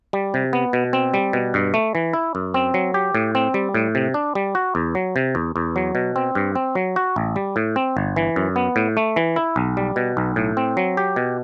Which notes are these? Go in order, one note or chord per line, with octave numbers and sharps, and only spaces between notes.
G3
C3
B3
B2
C4
G3
B2
G2
A3
E3
E4
F#2
C4
F#3
G4
A2
C4
G3
A2
C3
D4
G3
F#4
E2
F#3
C3
E2
E2
F#3
B2
C4
G2
C4
F#3
F#4
A1
G3
A2
C4
G1
E3
F#2
B3
A2
A3
E3
E4
B1
G3
B2
B1
A2
C4
F#3
G4
B2